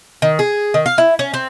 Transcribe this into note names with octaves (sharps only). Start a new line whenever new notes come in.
D#3
G#4
D#3
F5
E4
C#4
C4